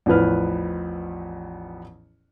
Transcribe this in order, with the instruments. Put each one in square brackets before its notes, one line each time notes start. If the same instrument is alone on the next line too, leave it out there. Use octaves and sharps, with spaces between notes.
[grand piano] A1 E2 F3 B4 F6